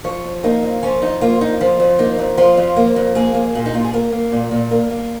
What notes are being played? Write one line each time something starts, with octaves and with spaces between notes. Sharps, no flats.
F3 C#5
F2
A#3 D#4
F2
F3 C#4
F2 D#4
A#3 F4
F2 D#4
F3
F2
A#3 D#4
F2
F3 F4
F2
A#3
F2
A#3 G#4
A#3
A#2
D#4
A#2 F4
G#4
A#3 A#4
A#3
A#2
A#2
A#3 A#4
A#3